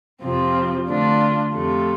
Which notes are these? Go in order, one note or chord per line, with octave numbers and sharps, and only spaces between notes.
F2 C3 F3 C4 F4
D3 A3 D4 F4
F2 C3 A3 F4